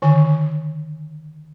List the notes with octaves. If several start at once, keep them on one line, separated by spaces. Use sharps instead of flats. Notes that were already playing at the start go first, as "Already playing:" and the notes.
D3 D#3 G#5